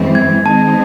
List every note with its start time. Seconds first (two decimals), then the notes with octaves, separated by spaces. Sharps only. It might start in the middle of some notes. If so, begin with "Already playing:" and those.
Already playing: F#2 E3 G#3 C4
0.15 G#6
0.46 D#3 G#3 C4 D#4 A5